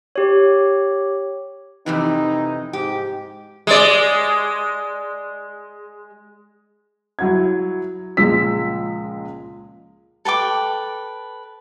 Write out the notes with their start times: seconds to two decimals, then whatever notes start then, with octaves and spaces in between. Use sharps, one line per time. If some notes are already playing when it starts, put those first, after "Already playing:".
0.16 G4 C#5
1.86 F2 C3 E3 D#4
2.73 G#2 G4
3.67 G#3 D5
7.19 F#3 E4 F#5 G#6
8.17 C#2 A#2 F3 G#3 E6 B6
10.25 A4 B4 G5 D6